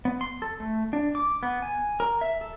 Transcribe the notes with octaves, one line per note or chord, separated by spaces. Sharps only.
B3
C6
A4
A3
D4
D6
B3
G#5
A#4
E5
A4